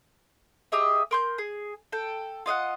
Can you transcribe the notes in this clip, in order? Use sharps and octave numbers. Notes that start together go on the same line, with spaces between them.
G4 G#4 D#5 E5
A#4 C6 G6
G#4
A4 G5
F4 D#5 F5 F#5